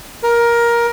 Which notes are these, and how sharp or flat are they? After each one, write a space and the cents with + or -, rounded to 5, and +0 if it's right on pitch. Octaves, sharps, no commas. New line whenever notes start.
A#4 +15